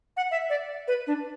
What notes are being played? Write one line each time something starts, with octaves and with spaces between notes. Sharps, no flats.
F#5
E5
D5
B4
D4